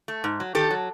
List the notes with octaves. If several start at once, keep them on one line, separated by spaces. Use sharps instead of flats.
A3
G#2
F#3
D#3 G4 A4
F#3